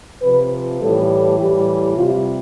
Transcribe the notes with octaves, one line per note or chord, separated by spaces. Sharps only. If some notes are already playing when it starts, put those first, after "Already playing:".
C3 F3 B4
A2 E3 G3 A4
A2 E3 G3 G4
C3 G3 F4